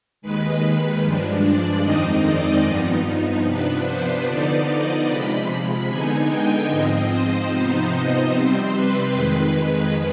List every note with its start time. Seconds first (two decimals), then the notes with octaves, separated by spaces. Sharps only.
0.22 D#2 D#3 G#3 B4
1.02 G2 F3 G#3 D4
1.43 D5
1.83 F2 D#3 G#3 C4 D#4 D#5
2.25 D5
2.65 G2 F3 B3 D#4
3.45 C3 F3 B3 D4 B4
3.87 C5
4.27 D3 F3 B3 D#4 D5
4.67 D#5
5.07 C3 F3 G#3 B5
5.89 D3 G#3 B3 D#4 G#5
6.30 G5
6.70 G#2 F3 C4 D#5
7.10 C5
7.51 C3 F3 B3 D#4
7.91 D#5
8.32 C3 G3 C4 C5
8.72 B4
9.13 F2 D#3 G#3 B4